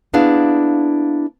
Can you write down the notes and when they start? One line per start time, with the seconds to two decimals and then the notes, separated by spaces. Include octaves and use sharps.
0.13 A#3 B3 D4 E4 G#4 F5